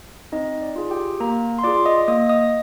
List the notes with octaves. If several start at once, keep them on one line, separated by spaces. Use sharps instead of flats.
C4 D#4 D#5
D5
F4 G#4
G4 G5
A#3 A#4 A#5
C6
F4 G#4 D5 D6
D#5 D#6
A#3 D#5 D#6
D#5 D#6